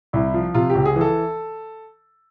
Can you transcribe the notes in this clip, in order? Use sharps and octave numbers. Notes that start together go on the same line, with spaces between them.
C2 E4
F3
C3 F4
G4
C#2
G#4
E3
A4